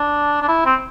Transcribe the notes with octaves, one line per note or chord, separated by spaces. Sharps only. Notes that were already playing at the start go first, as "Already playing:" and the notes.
Already playing: D4
D4
E4
C4